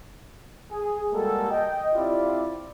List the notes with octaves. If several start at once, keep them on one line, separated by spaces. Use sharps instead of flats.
G#4
G3 G#3 A#3 F#4 G4 A4
D#5 G5
C4 E4 F4 G4 D5